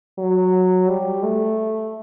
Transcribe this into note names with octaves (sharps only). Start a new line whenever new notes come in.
F#3
G3
A3